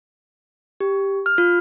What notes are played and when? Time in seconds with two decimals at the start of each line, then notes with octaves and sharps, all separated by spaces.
0.80 G4
1.26 F6
1.38 F4